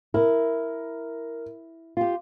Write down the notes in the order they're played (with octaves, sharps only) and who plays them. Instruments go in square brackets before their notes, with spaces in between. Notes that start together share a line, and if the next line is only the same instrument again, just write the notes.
[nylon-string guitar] E4 [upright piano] A#4
[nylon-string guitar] F4 G4